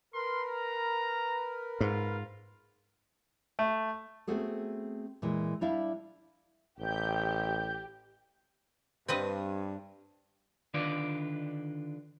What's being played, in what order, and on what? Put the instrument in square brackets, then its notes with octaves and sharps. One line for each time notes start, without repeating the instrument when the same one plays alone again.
[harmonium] A#4 B4 [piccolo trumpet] C6
[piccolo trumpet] A#5
[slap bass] G#2 [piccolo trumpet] F4
[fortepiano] A3
[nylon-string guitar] A3 B3 C4 F#4 G#4 A4
A#2 E3 G#3
G3 D4 E4 D5 E5 F5
[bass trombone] A1 [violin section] G4 [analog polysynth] G6
[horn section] G2 [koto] C4 B4 D#5
[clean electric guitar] D3 D#3 D4 F4 B4 D5